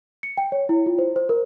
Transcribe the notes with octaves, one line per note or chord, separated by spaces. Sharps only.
C#7
G5
C#5
E4
F4
C5
C5
A#4